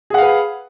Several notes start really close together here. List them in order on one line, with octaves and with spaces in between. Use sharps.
G#4 F#5 F5 B4